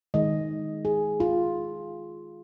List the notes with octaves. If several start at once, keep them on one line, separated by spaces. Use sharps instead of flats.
D#3 G#3 D#5
G#4
F4